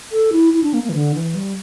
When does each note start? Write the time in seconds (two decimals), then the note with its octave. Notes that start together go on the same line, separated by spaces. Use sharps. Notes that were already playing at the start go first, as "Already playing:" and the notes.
0.12 A4
0.32 E4
0.54 E4
0.63 D4
0.74 A#3
0.84 A#3
0.89 E3
0.94 D3
1.15 E3
1.35 G3